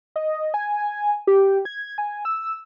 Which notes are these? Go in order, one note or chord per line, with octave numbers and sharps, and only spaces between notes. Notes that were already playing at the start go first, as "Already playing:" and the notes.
D#5
G#5
G4
G#6
G#5
E6